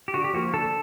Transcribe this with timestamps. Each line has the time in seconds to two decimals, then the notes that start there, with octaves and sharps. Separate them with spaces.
0.08 G4
0.14 D3 F#4
0.24 G4
0.33 F3 A#3 F#4
0.54 D3 A4